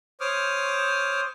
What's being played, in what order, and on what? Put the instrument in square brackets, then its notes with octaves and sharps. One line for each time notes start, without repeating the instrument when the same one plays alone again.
[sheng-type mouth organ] C5 C#5 D6 D#6 F6